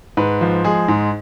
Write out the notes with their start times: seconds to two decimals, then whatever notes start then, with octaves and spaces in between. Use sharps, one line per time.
0.17 G#2 B4
0.41 F3
0.64 G#3 G#4
0.88 G#2